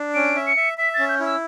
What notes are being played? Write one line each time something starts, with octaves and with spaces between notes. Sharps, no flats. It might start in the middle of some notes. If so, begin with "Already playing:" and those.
Already playing: D4
C#4 D7
E5
C#7
E5
E5 B6
C#4 A6
G6
E4
E6